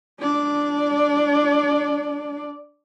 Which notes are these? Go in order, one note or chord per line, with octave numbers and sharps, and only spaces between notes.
D4 D5